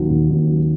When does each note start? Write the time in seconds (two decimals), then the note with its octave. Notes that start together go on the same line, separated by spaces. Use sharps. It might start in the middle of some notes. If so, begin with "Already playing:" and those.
Already playing: D#2 F#3
0.11 D#2
0.31 D#2
0.49 F#3